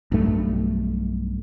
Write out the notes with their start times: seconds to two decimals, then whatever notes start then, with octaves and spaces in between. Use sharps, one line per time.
0.12 B1 G2 A3